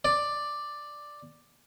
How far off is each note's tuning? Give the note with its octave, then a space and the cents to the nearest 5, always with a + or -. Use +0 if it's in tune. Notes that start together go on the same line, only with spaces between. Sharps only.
D5 +5